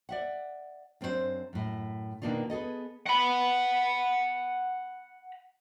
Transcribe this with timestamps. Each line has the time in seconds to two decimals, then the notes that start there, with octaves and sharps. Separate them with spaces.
0.09 D5 E5 F#5
1.01 F#2 C4 D4 E4 C5
1.53 F#2 A2
2.22 B2 D#3 A#3 D4 D#4 F4
2.50 B3 G#4 A4 D#5
3.06 F#5 B5